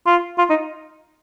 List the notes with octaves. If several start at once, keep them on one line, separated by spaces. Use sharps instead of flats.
F4
F4
D#4